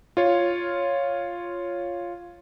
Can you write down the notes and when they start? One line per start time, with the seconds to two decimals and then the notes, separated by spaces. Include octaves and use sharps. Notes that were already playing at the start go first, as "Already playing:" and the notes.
0.17 F4 C#5